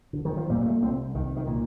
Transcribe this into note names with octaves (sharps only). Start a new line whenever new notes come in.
D3
D#3
F3
A#2 G3
G3
A3
C2 C4
C2 D#3
D#3
A#2